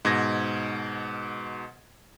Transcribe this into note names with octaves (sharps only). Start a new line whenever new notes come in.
G#2 B2 G#6 A#6